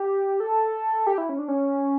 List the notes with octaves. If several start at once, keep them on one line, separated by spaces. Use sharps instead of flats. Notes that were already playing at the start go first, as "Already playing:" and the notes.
Already playing: G4
A4
G4
E4
C#4
D4
C#4